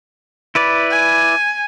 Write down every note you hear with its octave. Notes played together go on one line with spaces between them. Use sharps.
E4 B4 D5
G#5